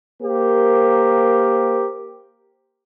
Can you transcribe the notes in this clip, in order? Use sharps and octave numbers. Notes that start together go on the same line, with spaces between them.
A#3 G4 A#4 C5